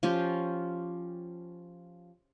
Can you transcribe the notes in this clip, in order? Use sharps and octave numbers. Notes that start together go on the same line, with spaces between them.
F3 C#4 F4 G4